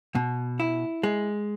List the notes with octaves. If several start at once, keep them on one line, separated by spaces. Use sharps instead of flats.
B2
E4
G#3